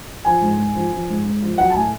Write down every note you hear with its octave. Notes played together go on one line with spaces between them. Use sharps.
F3 G#5
G#2
G#2
F3
F3
G#2
G#2
F3
F#3 F#5
A5
A2 G#5